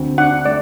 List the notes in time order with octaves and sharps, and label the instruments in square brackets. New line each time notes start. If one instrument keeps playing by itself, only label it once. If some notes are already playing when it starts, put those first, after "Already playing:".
Already playing: [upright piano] D2 C4
[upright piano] D4 [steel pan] F#5
[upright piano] A3 [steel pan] D5